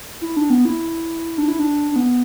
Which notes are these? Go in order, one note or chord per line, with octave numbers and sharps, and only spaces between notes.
E4
D4
B3
E4
D4
E4
D4
D4
B3